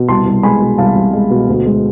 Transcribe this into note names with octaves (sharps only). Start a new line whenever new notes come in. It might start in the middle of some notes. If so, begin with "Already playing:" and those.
Already playing: B2
C2 A5 C6
C2
G#3 G#5 B5
B2
C2 F5 A5
C2
G#3
B2
D2
G#3